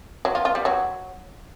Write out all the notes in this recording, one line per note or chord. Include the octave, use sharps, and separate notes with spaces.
F#3
F4
F4
G3
F#3